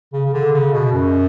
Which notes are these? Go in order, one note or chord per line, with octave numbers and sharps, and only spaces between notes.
C#3
C#3
D3
C#3
B2
F#2